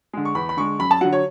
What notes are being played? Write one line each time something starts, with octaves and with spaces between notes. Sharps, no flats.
D3 G#3
C#6
E2 B5
B5
D3 G#3 C#6
F#2 B5
A5
D3 F#3 F#5
C#5